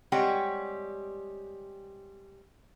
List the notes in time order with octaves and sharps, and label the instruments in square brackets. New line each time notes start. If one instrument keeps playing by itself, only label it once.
[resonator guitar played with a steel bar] G3 G#3 C4 G4 C#5 F#5